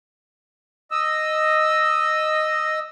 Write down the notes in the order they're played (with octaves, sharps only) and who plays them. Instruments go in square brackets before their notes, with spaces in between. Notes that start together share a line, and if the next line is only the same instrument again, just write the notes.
[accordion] D#5 E6